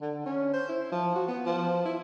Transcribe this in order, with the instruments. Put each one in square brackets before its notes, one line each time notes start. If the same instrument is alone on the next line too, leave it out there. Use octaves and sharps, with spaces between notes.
[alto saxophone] D3
C#4
C5
E4
F3
F#4
B3
F3
E4